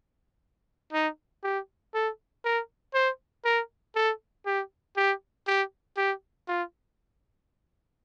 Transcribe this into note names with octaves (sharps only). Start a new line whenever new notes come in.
D#4
G4
A4
A#4
C5
A#4
A4
G4
G4
G4
G4
F4